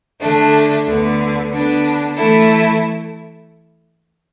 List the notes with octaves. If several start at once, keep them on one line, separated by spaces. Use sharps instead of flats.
D3 A3 D4
D2 D3 B3
D3 B3 D4
E3 A3 E4 A4